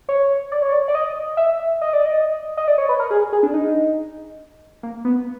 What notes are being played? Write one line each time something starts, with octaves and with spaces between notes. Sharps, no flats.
C#5
D5
C#5
D5
D5
D#5
E5
D#5
D5
D#5
D#5
D5
C#5
B4
A#4
G#4
G#4
D4
D#4
A#3
B3